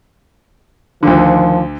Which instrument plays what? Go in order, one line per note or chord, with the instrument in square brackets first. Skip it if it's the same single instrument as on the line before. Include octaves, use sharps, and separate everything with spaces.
[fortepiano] D2 D3 [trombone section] D#3 F3